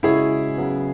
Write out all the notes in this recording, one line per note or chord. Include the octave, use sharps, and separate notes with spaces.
C#3 G#3 C#4 E4 F#4 G#4 C#5
C#3 F#3 B3